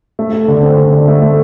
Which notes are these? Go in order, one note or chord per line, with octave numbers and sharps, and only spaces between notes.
A3
A3
D3
C4
D3
D3
A3
A3